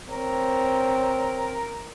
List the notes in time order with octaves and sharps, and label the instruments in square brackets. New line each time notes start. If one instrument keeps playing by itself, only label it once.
[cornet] C4 [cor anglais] A#4 [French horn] C#5